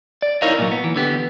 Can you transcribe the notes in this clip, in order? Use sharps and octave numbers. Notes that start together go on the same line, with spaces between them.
D5
D#4 E4 A#4 C#5 D#5 F5
A#2 F#3
B3
E3
D3 B3 G4